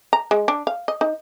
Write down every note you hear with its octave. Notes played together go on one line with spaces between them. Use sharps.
A#5
G#3
D4
F5
D#5
D#4